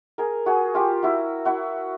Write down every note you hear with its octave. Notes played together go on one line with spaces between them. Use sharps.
G#4 A#4
F#4 G#4
F4 G4
E4 F#4
E4 F#4